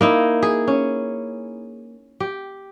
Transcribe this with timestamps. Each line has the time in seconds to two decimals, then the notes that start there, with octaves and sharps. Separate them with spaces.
0.01 A#3 D#4 E4
0.42 G#4
0.68 C#4
2.20 G4